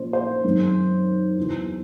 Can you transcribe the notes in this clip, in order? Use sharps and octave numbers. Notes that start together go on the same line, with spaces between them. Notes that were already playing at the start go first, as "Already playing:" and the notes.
Already playing: A#2 F3 A#3 C#4 C5
C5
F#2 D#3 G#3 C4
E2 C#3 F#3 B3